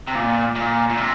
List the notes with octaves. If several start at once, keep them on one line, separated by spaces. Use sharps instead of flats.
C3
A#2
A#2
A#2
C3